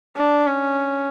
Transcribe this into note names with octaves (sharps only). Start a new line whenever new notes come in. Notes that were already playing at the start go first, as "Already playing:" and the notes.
D4
C#4